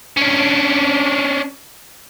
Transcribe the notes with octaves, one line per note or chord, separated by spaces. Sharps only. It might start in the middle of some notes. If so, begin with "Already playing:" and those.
C#4 D4